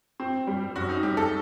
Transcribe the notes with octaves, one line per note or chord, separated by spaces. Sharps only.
C4
G3
F#2 F#4
D#4
G3 G4
A4